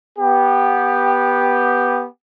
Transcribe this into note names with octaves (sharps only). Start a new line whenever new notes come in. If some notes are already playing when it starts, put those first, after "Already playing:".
B3 G4